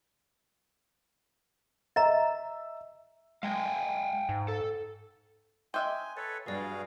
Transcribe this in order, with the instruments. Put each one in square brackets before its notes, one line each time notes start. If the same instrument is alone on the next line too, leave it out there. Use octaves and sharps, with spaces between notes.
[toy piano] D#5 A#5 [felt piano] E5
[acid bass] G#3 [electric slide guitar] F5 G5 G#5
[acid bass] G#2
[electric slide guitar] A4
[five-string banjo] D#5 E5 G5 [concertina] G#5 [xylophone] C6 D6 F#6
[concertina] A4 B4 C#5 [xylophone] A6
[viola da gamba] G2 G3 [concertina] F#4 G#4 F5 [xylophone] B4 D5